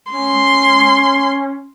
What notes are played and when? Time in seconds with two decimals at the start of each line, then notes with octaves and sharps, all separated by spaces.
0.12 C#4 C6